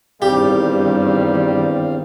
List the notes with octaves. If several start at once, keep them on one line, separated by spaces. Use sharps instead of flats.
E2 G2 D#3 G3 C4 G4 F5